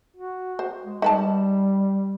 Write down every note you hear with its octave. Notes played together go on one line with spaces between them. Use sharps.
F#4
C5
G#3
G3 D#4 B4 A5